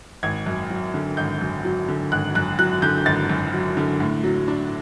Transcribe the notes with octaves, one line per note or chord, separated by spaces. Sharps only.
G#1 G#6
F#2
F#3
D3
G#1 G6
F#2
F#3
D3
G#1 F#6
F#2 F#6
F#3 F#6
D3 G6
G#1 A6
F#2
F#3
D3
A2
F#3
D4